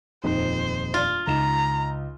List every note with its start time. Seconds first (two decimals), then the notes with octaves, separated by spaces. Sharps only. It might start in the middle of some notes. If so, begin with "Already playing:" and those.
0.24 D#1 F2 D#4 C5
0.94 F4
1.27 C#2 D#4 A#5 E7